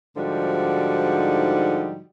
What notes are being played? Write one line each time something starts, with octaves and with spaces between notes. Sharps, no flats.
G#2 D3 F3 G3 D#4 F#4